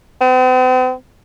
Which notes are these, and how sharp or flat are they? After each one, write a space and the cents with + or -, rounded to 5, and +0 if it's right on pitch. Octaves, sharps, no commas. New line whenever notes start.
C4 -45